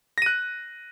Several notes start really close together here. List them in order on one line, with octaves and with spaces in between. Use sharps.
A#6 D#7 F#6